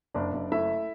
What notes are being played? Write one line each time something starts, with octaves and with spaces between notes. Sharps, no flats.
F#1 D4 D5
F#1
A3 E4 E5